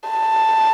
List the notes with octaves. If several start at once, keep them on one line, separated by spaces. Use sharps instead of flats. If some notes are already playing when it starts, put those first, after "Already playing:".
A5